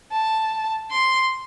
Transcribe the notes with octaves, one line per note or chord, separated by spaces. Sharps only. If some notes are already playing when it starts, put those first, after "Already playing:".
A5
C6